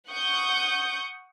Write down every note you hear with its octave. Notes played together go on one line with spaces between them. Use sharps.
F#5 C#6 D#6 G6